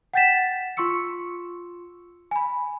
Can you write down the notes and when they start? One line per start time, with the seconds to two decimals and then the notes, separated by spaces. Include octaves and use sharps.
0.14 F#5 G5 G6 A6 B6 E7
0.77 F4 C6 C#6 E6 C#7
2.31 G#5 B5